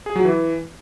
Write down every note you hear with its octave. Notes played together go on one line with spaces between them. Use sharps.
G#4
F#3
E3